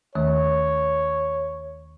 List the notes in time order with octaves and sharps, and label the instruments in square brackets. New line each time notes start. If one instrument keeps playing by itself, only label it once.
[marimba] D#2 D#3 A3 [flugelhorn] C#5